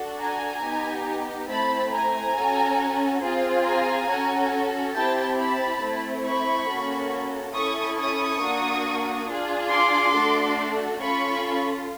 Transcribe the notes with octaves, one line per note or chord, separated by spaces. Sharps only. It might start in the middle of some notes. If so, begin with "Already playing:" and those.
Already playing: D4 F#4 A4
G#5 A#5
B3 D#4 G4
A3 C4 E4 A5 B5
G#5 A#5
C#4 F#4 A4
C4 F4 G#4
G#5 A#5
C#4 F#4 A4
C4 E4 G4 G5 A5
A5 B5
A3 C4 E4
B5 C#6
A#3 C#4 F#4 A4
C#4 E4 A4 C#6 D#6
C#6 D#6
A#3 D4 F#4
D4 F4 G#4
C6 D6
A3 D4 F#4 A4
C#4 F4 A4 B5 C#6